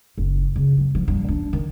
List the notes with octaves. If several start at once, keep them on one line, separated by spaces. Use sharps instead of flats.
F#1
C#3
F#3
F3
G2
D4
D#3